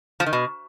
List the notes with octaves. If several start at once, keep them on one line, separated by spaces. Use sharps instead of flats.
F3
D#3
B2